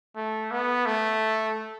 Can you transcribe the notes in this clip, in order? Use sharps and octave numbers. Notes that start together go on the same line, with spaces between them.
A3
B3
A3